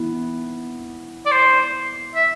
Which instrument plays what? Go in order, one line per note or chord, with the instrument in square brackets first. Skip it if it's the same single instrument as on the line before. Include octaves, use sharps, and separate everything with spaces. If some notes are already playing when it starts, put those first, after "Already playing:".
Already playing: [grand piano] E3 B3
[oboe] D5
C5
E5